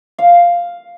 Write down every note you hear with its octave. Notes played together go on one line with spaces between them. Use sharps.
F5